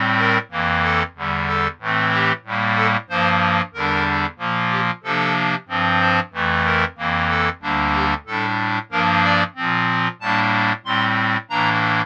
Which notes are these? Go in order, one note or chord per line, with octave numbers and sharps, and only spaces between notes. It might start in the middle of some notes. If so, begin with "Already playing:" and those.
Already playing: A2 G3 C4
A#4
F2 E3 A#3
A4
E2 D3 G3
A4
A2 E3 A3 C4
G4
A2 G3 A#3
A4
G2 F3 A#3 C5
E2 D3 G3 D4 A#4
A#2 F3 A#3
G4
C3 F3 A#3 D4 A4
G2 F3 C4
C5
F2 E3 A3
A#4
F2 E3 A#3
A4
D2 D3 G3 A#3 D4
G4
A2 G3 D4 A4
G2 F3 A#3 D4 A#4
D5
A#2 F3 C4
A2 G3 A#3 D4 A5
A2 G3 C4 C6
A2 E3 A#3 D4 A#5